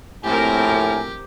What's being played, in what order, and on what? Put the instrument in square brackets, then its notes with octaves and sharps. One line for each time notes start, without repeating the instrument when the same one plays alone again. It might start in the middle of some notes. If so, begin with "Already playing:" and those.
[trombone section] A#1 A2 [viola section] C4 A#4 [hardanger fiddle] G4 [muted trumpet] G#5